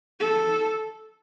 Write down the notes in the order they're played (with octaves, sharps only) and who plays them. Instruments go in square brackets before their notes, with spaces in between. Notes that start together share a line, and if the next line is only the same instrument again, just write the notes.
[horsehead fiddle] A4